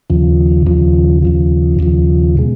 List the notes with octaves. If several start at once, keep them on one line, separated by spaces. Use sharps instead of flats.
D#2 C#3 F3
D#2 C#3 F3
D#2 C#3 F3
D#2 C#3 F3
B2 G#3